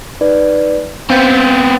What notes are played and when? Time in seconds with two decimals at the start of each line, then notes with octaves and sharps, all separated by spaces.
0.21 D#4 B4 D5
1.10 B3 C4 F5 G6 A6